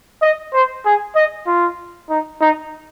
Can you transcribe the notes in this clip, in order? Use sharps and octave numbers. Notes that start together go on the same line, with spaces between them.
D#5
C5
G#4
D#5
F4
D#4
D#4